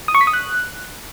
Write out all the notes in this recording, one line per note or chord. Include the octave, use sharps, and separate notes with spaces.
D#6
C#6
B6
D#6
F#6